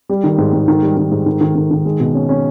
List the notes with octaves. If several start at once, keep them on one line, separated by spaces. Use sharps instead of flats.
G3
D#3
G#2
G#2
D#3
G3
D#3
G#2
D#3
D#3
D#3
D#3
G#3
B2
C#4
C#4